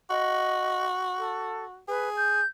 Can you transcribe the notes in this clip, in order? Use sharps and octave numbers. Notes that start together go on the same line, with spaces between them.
F#4 D#5
A4
G#4 B4
G6